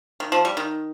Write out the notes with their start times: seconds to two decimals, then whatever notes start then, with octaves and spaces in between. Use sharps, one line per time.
0.20 D#3
0.32 F3
0.45 G3
0.57 D#3